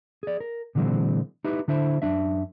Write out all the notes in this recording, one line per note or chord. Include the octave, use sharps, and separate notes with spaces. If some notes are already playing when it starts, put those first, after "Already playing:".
G#4 D5
A#4
A#2 D3 E3 F#3 G#3 C4
D#4 E4 G4 B4
D3 D4 E4 C5
F#2 C#3 D4 E5